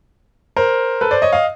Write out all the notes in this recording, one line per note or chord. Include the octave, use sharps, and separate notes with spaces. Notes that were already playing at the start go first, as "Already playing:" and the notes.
A#4 C5
A4 B4
C5 D5
C#5 D#5
D#5 F5